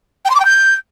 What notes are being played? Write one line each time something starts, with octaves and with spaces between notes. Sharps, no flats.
G5
C6
D6
G5
G6